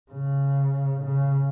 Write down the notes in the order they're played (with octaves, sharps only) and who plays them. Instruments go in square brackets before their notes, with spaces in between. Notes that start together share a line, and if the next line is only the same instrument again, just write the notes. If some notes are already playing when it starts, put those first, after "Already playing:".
[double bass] C#3
C#3